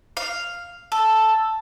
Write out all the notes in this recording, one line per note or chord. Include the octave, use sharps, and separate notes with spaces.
F5
A4